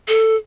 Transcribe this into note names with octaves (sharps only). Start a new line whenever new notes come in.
A4